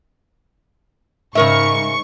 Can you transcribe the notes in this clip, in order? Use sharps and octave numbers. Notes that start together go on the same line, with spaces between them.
G#2 C#3 A#4 E5 C#6